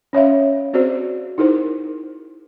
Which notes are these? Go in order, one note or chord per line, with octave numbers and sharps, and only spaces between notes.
C#4 C#5 E5 F5
C4 F#4 G#4 C5 D5
D#4 E4 G#4 A#4 C5